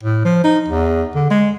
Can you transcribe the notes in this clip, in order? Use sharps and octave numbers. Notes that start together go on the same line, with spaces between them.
A2
F3
D#4
E2
D3
G#3